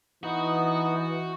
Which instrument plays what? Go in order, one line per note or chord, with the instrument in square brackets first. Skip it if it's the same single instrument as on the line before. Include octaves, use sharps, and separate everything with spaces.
[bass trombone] E3 [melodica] B3 D#4 [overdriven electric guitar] F#4